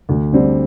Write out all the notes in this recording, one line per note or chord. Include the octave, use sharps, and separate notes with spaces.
D2
D3 G3 C4